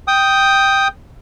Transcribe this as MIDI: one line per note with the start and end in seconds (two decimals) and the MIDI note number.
0.08 0.88 79
0.08 0.88 87